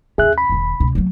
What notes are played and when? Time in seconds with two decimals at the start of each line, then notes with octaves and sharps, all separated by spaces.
0.18 D#2 C#4 G#4 E5 F#6
0.38 B5
0.49 E1 D#3
0.80 C#2 B2
0.95 F#3 A#3